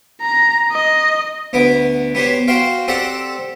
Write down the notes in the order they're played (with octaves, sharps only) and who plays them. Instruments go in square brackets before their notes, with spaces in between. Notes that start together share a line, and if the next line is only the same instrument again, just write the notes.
[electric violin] A#5
D#5
[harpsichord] D2 B3 D6
B3 G4 C5 C#5
F#4 C5 F5 G5
C4 G4 A4 D5 F#5